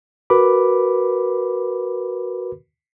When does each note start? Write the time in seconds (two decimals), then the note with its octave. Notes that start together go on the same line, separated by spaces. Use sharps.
0.30 F#4 A#4 B4 B5 D6